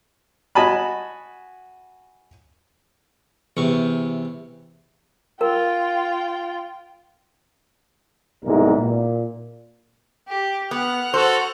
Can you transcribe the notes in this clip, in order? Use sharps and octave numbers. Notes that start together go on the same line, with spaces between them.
F#4 D#5 G#5 A5 B5
E2 C3 C#6
F4 A#4 G5
B1 G#2 C3 G3 E4 A#4
A#2
G4
B3 F#5 F6
F#4 A4 C5